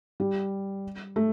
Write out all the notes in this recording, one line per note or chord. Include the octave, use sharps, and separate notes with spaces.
G3
A3